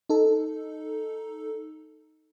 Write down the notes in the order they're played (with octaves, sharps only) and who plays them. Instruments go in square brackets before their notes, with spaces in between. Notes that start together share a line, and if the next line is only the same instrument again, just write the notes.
[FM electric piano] D#4 A4